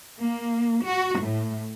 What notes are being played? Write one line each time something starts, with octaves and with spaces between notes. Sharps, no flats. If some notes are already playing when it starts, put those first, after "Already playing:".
A#3
F#4
A2